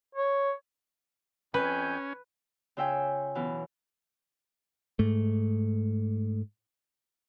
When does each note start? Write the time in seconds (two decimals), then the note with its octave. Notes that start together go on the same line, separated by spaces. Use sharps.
0.15 C#5
1.54 F2 C#4 B4 G#5 G6
2.77 C#3 F4 E5 G5 G#5
3.35 F#2 B2 E3
4.99 G#2 A3